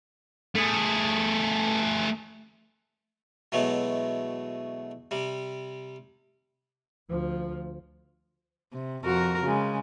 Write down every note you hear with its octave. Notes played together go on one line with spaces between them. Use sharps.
A3 G#4
B2 E3 F#3 G#3 A3
C3 G3
D2 F3
C3
F2 F#4 A#4
C#3 G#3